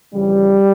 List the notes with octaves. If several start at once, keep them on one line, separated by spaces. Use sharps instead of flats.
F2 C#3 E3 G3